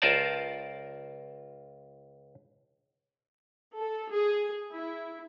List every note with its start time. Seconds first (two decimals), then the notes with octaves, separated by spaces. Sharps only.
0.02 C#2 F4 A#4 C5 D5 A5
3.78 A4
4.10 G#4
4.74 E4